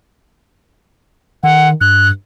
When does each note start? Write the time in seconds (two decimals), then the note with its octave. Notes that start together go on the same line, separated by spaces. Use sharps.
1.43 D#3 F#5
1.81 G2 F#6